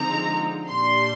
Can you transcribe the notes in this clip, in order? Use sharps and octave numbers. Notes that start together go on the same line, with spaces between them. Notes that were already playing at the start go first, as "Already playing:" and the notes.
Already playing: D3 F3 G#3 C4 D#4 A#5
A#2 G3 D4 C6